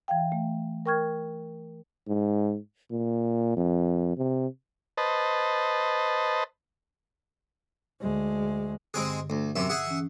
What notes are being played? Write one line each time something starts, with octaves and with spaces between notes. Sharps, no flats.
E3 E5 F5 G5
A3
A#4 G5 C#6 F6 G#6
G#2
A#2
F2
C3
B4 C5 D#5 A5
D2 G#3
G2 D3 G#3 C4 G#4
D2
F#2 C3 E5
G#4 E5 F#5
E3 C#4